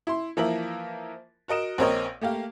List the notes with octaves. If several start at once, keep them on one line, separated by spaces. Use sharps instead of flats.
E4 C6
E3 F3 A#3 A#4 E5 F#7
F#4 A#4 D#5 D7 E7
A#1 C4 A#4 C5 C#5 D#5
A3 A#3 G4 F5